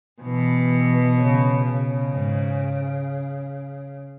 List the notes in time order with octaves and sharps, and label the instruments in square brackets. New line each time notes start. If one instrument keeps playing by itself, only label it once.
[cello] B2 [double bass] E3
[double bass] C#3
C#3
[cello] G#2